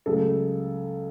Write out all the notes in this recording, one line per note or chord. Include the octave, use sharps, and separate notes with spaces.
C#2 C#3 F#3 A3 A4